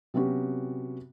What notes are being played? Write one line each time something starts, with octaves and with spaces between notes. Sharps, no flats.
C3 F#3 B3 C#4 F#4 G4